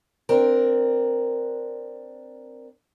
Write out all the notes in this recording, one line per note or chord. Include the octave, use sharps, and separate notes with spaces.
C4 D4 A#4